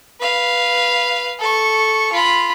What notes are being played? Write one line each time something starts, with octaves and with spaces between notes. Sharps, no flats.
B4 F5
A4 C#6
F4 B5